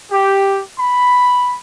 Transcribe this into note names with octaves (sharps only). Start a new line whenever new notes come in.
G4
B5